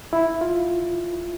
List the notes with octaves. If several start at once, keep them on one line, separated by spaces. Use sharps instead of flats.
E4
F4